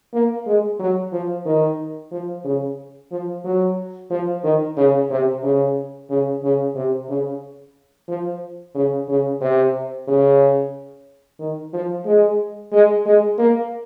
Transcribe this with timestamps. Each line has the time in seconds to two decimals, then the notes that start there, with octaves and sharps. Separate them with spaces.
0.13 A#3
0.46 G#3
0.79 F#3
1.12 F3
1.46 D#3
2.11 F3
2.45 C#3
3.12 F3
3.45 F#3
4.10 F3
4.44 D#3
4.77 C#3
5.10 C3
5.43 C#3
6.10 C#3
6.43 C#3
6.75 C3
7.09 C#3
8.08 F3
8.75 C#3
9.09 C#3
9.41 C3
10.08 C#3
11.40 D#3
11.73 F3
12.06 G#3
12.72 G#3
13.06 G#3
13.39 A#3